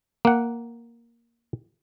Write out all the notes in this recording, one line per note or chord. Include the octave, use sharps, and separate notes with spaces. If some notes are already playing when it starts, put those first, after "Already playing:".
A#3 F#5